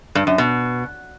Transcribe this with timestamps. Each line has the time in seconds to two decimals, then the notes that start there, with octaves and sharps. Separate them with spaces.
0.15 G2
0.27 F#2
0.38 B2